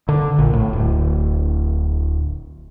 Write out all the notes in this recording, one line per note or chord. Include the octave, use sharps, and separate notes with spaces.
D3
A#1
A2
D1